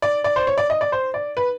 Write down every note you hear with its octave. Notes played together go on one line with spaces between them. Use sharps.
D5
D5
C5
C#5
D5
D#5
D5
C5
D5
B4